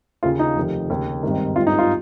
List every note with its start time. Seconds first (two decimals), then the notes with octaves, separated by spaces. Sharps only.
0.23 D#2 C#3 F4
0.39 D#4
0.56 F1 D#2 D#3
0.90 D#2 C#3
1.23 G#1 G2 D#3
1.56 G#1 G2 D#3 F4
1.67 D#4
1.79 F4